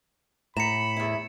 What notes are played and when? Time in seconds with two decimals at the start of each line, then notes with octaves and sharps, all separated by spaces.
0.57 A2 A#5 B5 C#7 E7
0.96 E2 E4